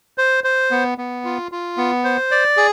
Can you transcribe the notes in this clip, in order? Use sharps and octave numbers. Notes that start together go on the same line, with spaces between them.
C5
C5
B3
B3
F4
F4
B3
C5
D5
G#4